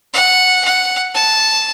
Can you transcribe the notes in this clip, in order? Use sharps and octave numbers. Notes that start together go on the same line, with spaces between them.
F#5
F#5
A5